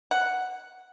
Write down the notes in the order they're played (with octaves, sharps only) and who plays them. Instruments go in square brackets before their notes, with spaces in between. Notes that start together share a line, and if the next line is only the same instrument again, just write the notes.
[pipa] F#5